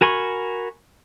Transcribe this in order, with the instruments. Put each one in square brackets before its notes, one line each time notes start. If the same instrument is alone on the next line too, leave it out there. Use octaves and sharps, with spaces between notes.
[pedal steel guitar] F#4 A#4 G#5 B5 C#6